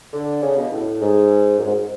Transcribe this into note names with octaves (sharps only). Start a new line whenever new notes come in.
D3
C#3
B2
A2
G#2
F#2
G#2